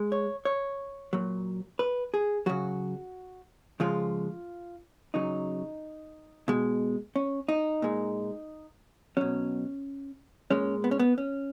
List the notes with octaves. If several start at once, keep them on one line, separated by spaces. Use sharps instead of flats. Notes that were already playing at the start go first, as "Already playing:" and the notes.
Already playing: G#3
C#5
C#5
A#2 F#3
B4
G#4
C#3 F#3 F#4
C#3 F3 G#3 F4
C#3 F#3 D#4
B2 G#3
C#4
D#4
A#2 G#3
B2 F#3 C#4
A#2 G#3 C#4
B3
C#4
B3
C#4